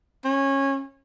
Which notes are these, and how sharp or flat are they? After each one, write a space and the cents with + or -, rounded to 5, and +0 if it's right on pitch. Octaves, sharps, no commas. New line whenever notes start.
C#4 -20